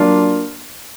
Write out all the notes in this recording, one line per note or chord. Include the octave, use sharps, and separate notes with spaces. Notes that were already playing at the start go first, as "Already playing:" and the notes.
Already playing: F#3 A#3 D4 F4